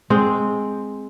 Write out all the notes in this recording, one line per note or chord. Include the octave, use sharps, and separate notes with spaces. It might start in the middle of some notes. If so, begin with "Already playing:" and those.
G#3 C4